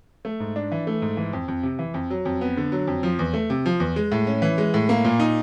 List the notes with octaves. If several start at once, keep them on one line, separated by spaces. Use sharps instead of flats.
A3
G#2
D4
E3
A3
G#2
E3
F2
F2
C3
E3
F2
F#3
F2
B3
D3
F#3
F2
F3
E2
A3
C3
F3
E2
G#3
A2
C#4
E3
G#3
A2
A#3
A#2
D#4